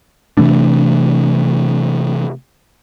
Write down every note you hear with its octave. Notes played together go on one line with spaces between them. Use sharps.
C3 E3 A3 D4